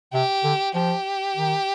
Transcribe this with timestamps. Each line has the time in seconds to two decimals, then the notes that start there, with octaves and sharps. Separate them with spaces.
0.13 C3 G4
0.44 D3
0.75 F3 G4
1.36 D#3